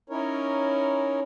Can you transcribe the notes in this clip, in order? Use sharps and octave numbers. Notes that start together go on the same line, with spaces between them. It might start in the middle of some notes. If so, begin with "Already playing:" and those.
C#4 D#4 E4 A#4 C#5